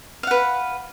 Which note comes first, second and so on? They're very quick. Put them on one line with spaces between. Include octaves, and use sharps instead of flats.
F5 F#5 B4